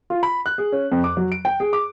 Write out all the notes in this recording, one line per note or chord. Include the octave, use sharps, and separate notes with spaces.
F4
B5
F#6
G#4
C#4
F2
D6
F#3
D7
G5
G#4
D6